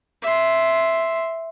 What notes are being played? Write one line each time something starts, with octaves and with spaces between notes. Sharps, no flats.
E5 C6